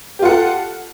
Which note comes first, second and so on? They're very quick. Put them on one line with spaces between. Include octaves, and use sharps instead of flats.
G4 F4 F#5 A4